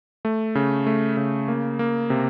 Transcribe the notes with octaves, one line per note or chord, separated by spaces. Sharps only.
A3
C#3
A3
C#3
A#3
A#3
C3